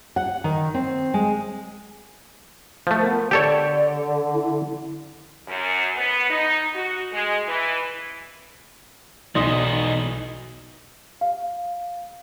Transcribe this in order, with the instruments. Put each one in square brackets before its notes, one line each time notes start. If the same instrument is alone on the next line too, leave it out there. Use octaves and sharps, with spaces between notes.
[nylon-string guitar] F#5
D#3
C4
G#3
[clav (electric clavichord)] F3 A3 [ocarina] C5
[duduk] B3 [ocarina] A#4
[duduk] D3 [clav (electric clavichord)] G4 A4 C#5 [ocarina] D5
[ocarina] E4
[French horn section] F#2
B3
D#4
F#4
G#3
E3
[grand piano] B1 D#4 A#6 [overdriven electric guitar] B2 E3 [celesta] D5 C6 D#6
[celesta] F5